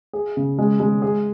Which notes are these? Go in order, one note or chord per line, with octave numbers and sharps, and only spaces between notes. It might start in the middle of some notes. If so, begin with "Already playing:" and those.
G#4
C#3
G#3
G#3
G#4